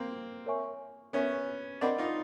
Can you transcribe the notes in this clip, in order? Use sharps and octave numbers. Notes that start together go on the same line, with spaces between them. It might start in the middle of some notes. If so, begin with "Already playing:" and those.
Already playing: A#3 C4
A#4 C#5 E5 G#5 C#6
B3 C#4 A#4 C#5 E5 G#5 C#6
C4 D4 A#4 D#5 F#5 B5 D6
D#4 F4